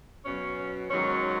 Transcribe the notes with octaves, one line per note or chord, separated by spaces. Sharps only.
B2 F#3 C#4
G#2 D#3 F#3 C#4